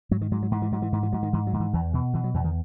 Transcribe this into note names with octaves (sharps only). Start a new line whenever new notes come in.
G#2 F#3
D#3
G#2 F#3
F#3
G#2 E3
E3
G#2 F#3
E3
G#2 E3
E3
G#2 F#3
D#3
G#2 E3
F#3
G#2 D#3
E3
E2 E3
B2 E3
B2 E3
F#3
E2 E3
D#3